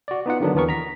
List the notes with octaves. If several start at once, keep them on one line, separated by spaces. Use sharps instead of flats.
F#4 D5
B3 D#4 F4 F#5
D3 D#3 F#3 B3 D4
D#2 E3 B3 A#4 C#6
A#5 B6